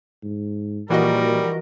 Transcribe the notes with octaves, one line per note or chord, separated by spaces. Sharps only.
G#2
A#2 E3 F3 G3 F#4 A#4 D#5